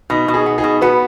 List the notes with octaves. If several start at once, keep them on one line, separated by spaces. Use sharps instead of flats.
B2 D#4
B2
D#4 G#4
B3
D#4 G#4
B2
B3 F#4 B4